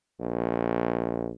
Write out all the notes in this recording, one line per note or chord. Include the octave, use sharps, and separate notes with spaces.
A#1